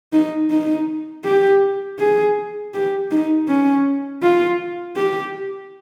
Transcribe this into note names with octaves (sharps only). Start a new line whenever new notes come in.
D#4
D#4
G4
G#4
G4
D#4
C#4
F4
G4